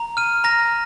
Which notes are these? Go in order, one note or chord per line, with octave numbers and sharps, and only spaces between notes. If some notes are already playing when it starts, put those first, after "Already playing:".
Already playing: A#5
F6 D#7
A#5 A#6